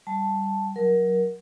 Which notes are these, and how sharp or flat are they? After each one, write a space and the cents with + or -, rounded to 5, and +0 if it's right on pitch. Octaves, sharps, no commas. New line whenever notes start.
G3 +0 A5 +0
F#3 +0 A#4 +20